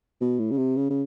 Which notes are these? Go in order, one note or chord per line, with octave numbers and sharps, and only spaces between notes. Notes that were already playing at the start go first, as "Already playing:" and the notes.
B2
A2
C#3
C3
C#3
C#3